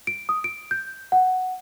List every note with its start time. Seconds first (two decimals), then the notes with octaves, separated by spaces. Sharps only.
0.07 D7
0.29 D#6
0.44 D7
0.71 G6
1.12 F#5